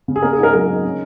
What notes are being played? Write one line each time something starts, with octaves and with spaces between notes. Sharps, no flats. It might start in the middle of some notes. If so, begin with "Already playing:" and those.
C#3
G#4
A#3 A#4
G#4
G#2 A#4
F#3 A#4
D#4
C#4